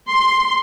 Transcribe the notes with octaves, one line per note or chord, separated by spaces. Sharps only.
C6